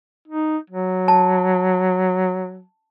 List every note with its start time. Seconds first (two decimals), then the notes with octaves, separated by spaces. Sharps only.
0.28 D#4
0.70 F#3
1.08 A5